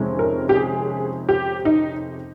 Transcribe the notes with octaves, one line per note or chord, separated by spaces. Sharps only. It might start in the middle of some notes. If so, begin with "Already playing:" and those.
Already playing: F2 C3 D#3 G#3 C#4
A#4
G4
G#4
G4
D#4